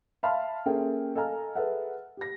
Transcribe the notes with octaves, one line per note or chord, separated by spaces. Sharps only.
E5 F5 A5 B5 C6 F6
A#3 C#4 G#4 A4 E5 G5
A4 D#5 F5 G#5 A#5 F6
G#4 A4 B4 E5 F#5
G4 A#6